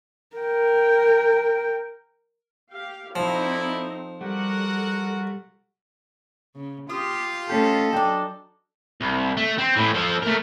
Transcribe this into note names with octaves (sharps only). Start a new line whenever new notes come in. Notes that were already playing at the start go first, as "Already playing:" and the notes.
A#4 G5
G4 F5
F3 C4 D#4 E4 A4 D5
G3 F#4 A4 A#4 F#5
C#3
F4 G4 F5 D#6
A3 C#4 G4 A4 D#5
F#3 D4 D5 G5
C2
A3
C4
A2 E3
F3 A4
A3 A#4